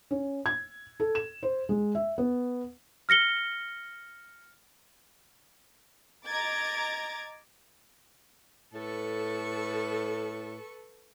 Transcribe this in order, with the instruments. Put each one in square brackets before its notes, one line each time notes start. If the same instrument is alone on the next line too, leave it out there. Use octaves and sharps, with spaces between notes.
[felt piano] C#4
G#6
A4
E7
C5
G#3
E5
B3
[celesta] F6 A#6 C#7 G7
[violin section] D#5 A#5 D6 G#6 A6
[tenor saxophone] A2 [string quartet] A4 B4 C#6